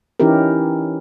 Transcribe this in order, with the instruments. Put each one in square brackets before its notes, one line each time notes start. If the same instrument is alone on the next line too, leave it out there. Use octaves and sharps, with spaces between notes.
[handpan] E3 C#4 D#4 E4 G4 A#4